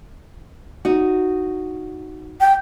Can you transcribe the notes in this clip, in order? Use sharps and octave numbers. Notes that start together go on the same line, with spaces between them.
D#4 F#4
G5